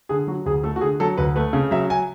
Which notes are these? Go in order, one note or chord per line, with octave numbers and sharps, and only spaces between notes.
D3 G#4
F#3 F#4
D2 G#4
A3 A4
F#4
D3 G#4
F#3 A4
D2 B4
A3 B4
C#3
F#3 E5
G#5